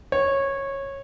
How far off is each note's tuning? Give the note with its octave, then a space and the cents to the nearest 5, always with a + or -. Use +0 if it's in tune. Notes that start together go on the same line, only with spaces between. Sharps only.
C#5 -15